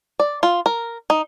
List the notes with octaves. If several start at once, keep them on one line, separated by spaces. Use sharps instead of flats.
D5
F4
A#4
D#4